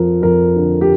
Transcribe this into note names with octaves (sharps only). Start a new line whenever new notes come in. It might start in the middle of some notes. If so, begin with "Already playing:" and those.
Already playing: F2 F3 A#4
F2 A#4
D3
G4